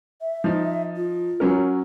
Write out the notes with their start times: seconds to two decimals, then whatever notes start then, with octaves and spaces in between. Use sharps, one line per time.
0.21 E5
0.44 F3 D#4
0.96 F4
1.40 F#3 C#4 A#4